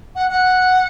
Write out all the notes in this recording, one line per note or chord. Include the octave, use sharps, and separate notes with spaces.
F#5
F#5